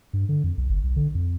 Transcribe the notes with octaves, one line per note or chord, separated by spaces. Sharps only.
G2
D3
F2
B1
G1
B1
D3
F2